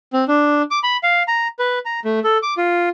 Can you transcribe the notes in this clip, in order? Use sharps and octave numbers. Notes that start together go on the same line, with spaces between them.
C4
D4
D6
B5
F5
A#5
B4
A#5
A3
A4
D6
F4